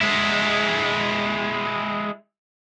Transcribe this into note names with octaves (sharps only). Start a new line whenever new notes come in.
G#3 E4